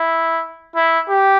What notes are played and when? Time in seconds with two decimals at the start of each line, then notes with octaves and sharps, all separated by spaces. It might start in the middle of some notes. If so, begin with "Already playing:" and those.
Already playing: E4
0.75 E4
1.09 G4